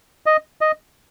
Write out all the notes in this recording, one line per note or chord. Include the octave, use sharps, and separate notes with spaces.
D#5
D#5